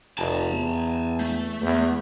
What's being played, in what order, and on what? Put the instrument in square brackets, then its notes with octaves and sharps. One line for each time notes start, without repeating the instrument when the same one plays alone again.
[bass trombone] F1 [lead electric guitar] G#5 A5
[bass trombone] E2
[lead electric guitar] A3
[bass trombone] E2